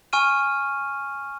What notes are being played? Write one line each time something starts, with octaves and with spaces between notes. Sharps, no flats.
G#5 C#6 F6 D#7